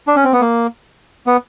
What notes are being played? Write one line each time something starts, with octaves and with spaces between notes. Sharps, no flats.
D4
C#4
C4
B3
A#3
B3